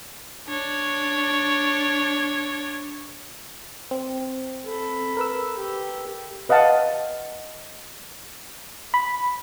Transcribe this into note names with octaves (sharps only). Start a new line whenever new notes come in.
D4 C#5
C4
A4 B5
A#4 B4 E6
G4
B4 D#5 F5 F#5 A5
B5